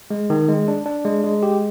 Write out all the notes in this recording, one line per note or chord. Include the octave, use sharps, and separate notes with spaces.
G#3
D#3
G#3
D4
D4
G#3
G#3
G4